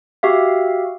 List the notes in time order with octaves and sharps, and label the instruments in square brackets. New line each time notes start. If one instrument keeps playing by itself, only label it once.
[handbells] F#4 G4 E5 F5